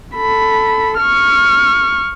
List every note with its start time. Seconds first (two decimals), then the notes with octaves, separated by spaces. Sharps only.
0.16 A4 B5
0.98 C#6 F6